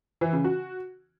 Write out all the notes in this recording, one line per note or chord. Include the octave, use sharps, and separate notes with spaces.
E3
C#3
F#4